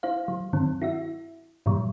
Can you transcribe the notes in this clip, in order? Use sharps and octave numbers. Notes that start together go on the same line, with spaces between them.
E4 C5 F5
F#3
G2 D#3 F#3 C4
E4 F#4 E5
G2 A#2 E3 F#3 G3